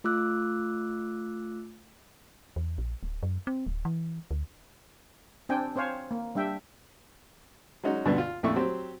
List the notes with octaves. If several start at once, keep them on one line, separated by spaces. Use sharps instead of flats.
A3 F4 D6 E6 F#6
E2
A#1
D1
F#2
C4
D1
E3
D2
C4 D4 G5 G#5
C4 C5 C#5 F5 G#5
A#3
G3 D4 E5 G5
F#3 G#3 C#4 D#4 F#4
D2 G2 B2 D3 B3
F4
A#1 F2 A3 E4 C#6
F#3 C4 G4 C5